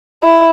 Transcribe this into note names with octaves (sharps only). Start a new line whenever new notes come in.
E4